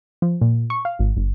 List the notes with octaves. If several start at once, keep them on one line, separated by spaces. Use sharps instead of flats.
F3
A#2
C#6
F5
G#1
G1